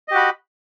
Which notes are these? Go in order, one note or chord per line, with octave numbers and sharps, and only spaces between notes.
F#4 G4 D#5 B5